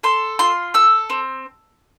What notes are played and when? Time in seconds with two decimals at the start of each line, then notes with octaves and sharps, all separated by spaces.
0.03 A4 C6
0.39 F4 C6
0.74 A4 E6
1.10 C4